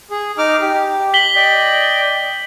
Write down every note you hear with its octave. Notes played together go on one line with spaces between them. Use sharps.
G#4
D#4 D6 F6
G4
B6 F#7 G7
D5 D#5 G5